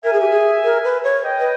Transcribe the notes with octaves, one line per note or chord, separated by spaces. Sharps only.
A#4 E5 G#5
G#4
G4
G#4
A#4
B4
C#5
D#5 G5
B4